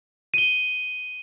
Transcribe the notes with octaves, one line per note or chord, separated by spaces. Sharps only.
D#7 G7